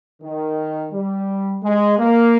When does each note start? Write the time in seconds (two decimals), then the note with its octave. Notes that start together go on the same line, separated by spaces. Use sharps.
0.23 D#3
0.92 G3
1.63 G#3
1.99 A#3